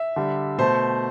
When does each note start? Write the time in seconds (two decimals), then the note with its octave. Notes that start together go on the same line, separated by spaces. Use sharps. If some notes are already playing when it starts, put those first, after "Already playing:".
Already playing: E5
0.16 D3 G3
0.58 B2 A3 C5